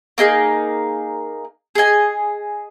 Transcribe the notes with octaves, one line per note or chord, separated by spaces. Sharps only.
A#3 D#4 G#4 D#5
G#4 D#5 G#5